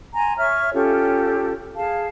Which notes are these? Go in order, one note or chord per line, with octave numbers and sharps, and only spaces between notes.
G#5 A#5 C6
C#5 E5 C#6 F6
C#4 F4 G4 A4
G#4 F5 A5